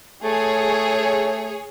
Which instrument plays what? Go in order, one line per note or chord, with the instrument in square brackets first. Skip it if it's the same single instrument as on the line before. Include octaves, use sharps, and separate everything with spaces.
[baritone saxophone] A3 [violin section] G#4 C#5